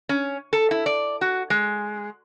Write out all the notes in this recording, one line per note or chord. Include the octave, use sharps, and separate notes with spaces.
C#4
A4
E4
D5
F#4
G#3